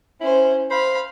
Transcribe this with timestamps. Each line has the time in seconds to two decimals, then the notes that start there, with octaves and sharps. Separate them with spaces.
0.21 C#4 E4 C5
0.71 C5 F5 B5